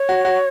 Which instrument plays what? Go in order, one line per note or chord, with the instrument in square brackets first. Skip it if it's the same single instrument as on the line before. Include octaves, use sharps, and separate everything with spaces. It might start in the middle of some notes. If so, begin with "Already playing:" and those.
Already playing: [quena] C#5
[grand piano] F#4
F#4